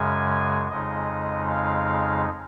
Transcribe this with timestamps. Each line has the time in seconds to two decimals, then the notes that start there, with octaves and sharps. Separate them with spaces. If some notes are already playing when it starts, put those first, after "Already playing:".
Already playing: F#2 C#3 G#3 G#5
0.69 F2 C#3 G#3 D#4 D#5
1.49 F5